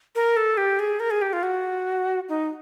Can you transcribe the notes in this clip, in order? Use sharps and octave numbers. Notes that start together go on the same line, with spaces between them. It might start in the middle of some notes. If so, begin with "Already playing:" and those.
A#4
A4
G4
G#4
A#4
G#4
G4
F4
F#4
D#4